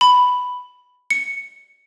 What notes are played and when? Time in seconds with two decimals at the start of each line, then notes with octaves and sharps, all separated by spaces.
0.01 B5
1.10 C#7